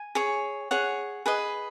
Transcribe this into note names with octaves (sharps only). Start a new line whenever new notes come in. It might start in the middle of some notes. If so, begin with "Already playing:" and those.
Already playing: G#5
G#4 C#5
G#4 C#5 F#5
G#4 B4 D#5